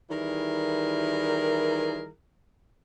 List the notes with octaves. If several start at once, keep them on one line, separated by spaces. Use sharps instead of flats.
D#3 E3 G3 E4 G#4 A#4